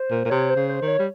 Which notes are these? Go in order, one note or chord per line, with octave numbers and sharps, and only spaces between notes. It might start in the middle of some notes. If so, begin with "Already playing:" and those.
Already playing: C5
A#2
A#2
C3 C#5
C5
C#3
C5
D#3
C#5
G3